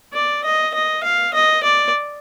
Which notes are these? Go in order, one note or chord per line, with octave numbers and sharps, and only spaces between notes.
D5
D#5
D#5
F5
D#5
D5